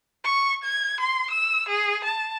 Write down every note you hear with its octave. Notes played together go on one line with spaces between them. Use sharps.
C#6
G#6
C6
E6
G#4
A5